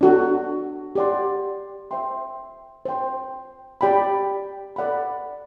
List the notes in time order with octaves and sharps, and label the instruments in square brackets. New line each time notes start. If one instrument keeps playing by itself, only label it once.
[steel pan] D4 F#4 A4
G4 D5 F#5 C6
C5 E5 G5 C6
C5 G5 C6
G4 D5 G5 B5
A4 D5 F#5 B5